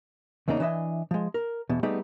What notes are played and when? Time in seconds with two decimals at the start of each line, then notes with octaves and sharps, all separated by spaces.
0.48 E2 C#3 A#3 D4 D#4
0.60 E3 D4 D#5 E5 G#5
1.11 F3 G#3
1.34 A#4
1.69 E2 B2
1.83 G3 A3 B3 D#4 G4 G#4